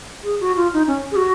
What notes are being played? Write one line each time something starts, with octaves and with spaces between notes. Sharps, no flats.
G#4
F#4
F4
D#4
C#4
G#4
F#4